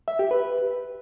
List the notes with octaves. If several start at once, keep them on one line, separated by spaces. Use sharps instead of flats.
E5
G4
B4